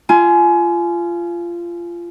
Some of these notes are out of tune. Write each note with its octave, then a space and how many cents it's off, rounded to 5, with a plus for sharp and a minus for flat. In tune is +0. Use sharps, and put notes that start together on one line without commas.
F4 -20 G#5 +25